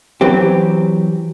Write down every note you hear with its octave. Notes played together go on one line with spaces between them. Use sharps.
E3 F#3 C4 G4